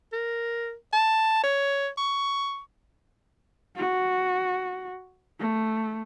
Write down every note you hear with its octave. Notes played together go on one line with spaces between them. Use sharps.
A#4
A5
C#5
C#6
F#4
A3